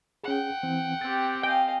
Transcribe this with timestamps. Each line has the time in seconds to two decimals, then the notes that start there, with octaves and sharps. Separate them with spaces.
0.24 C#4 G#4 F#5 G5
0.63 E3 C4
1.01 C4 G4 A6
1.43 D#5 F5 G5 G#5